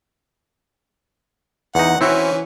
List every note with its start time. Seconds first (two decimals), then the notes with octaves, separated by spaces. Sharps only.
1.75 E2 D#4 F#5
2.01 E3 C4 C#4 E4 F#4